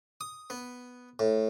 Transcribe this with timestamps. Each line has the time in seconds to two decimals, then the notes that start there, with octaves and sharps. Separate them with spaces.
0.21 D#6
0.50 B3
1.19 A2